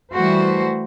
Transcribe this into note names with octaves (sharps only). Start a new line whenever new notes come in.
E3 G3 A3 F#4 C5